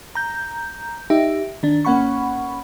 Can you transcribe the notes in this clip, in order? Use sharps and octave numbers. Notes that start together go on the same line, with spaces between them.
A#5 G6
D#4 G4 E5
D#3 D4
G#1 A#3 C#4 F#5 B5 C#6